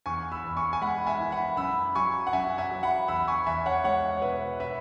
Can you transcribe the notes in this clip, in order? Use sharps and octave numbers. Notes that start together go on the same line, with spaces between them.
E2 G#5 C#6
B5 E6
E2
G#5 C#6
G#5
G#3 F#5 B5
E5 G#5
E3
F#5 B5
F#2 B5 E6
F#3 G#5 C#6
F#5
F#2 E5 G#5
E5 G#5
F#3
F#5 B5
E2 B5 E6
B5
G#5 C#6
E2 E5 G#5
C#5 F#5
G#3 C#5 F#5
C#5
B2 B4 E5
B4 E5